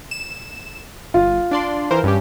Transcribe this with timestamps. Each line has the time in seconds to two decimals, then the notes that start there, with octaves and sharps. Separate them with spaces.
0.11 E7
1.14 G1 F4
1.51 D4 D5 C6
1.91 E3 A#4 C5
2.03 G2 C#4 G4